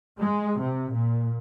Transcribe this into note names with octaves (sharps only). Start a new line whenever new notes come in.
G#3
C3
A#2